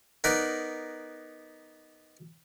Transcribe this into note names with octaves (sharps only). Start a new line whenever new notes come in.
B3 D#4 A#4 B4 D5